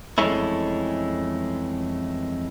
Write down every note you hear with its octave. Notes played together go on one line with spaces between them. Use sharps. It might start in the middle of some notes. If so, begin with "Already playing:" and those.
F2 E3 G#3 A3 C#4 E4